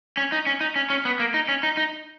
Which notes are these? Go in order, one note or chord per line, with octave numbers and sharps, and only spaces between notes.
C#4
D#4
C#4
D#4
C#4
C#4
B3
A#3
D#4
C#4
D#4
D#4